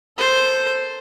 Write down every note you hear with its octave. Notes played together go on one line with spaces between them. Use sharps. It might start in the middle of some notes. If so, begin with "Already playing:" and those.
A4 C5